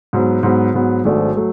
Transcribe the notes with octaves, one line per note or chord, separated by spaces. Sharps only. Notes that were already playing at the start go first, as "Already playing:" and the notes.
G#2 F#3 B3
G#2 F#3 B3
G#2 F#3 B3
G#1 G#2 F#3 A3 D4
F#3 A3